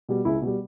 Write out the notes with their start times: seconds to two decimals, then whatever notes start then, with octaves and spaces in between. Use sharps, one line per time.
0.09 B2 G3
0.25 C#2 E4
0.41 B2
0.47 G3